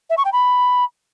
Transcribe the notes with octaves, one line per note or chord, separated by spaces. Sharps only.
E5
C#6
G5
B5